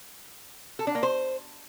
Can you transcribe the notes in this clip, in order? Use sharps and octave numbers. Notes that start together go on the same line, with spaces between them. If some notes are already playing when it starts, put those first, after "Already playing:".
A4
D4
A#3
C5